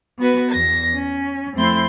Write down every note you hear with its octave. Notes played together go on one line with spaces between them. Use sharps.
B3 F#4 B4
E2 A#6
C#4
F2 A3 C4 E4 C6 G6